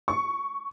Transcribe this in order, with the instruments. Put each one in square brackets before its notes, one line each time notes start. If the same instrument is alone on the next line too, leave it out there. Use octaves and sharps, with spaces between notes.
[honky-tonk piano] C#6